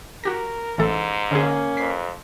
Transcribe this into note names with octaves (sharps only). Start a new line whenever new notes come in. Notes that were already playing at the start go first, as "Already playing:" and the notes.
F#4 G4 A#4 A#6
A1 G#2 E3 A4
D3 A#3 C#4 G#4
F2 B6 C7